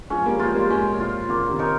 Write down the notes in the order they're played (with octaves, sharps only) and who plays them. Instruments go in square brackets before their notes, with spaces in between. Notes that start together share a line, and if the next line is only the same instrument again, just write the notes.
[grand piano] F3 G#3 [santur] C#4
[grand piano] G3 A#3
[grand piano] F3 G#3 [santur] F4 C5
[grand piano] G3 A#3
[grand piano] F3 G#3 [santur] C#4
[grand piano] A#2
[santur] F4 C5
[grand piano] A#2 C#3 [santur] A#3
[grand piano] C3 D#3
[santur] D#4 A#4 C#5